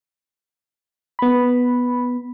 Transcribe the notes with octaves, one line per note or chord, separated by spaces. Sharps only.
B3 B5